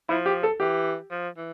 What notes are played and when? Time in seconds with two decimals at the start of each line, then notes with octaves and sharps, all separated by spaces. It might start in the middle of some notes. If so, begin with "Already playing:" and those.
0.09 F3 E4
0.26 G4
0.43 A4
0.60 E3 G4
1.11 F3
1.37 E3